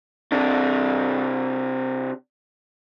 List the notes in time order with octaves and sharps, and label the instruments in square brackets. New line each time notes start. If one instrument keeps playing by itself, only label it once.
[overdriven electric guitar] C3 D4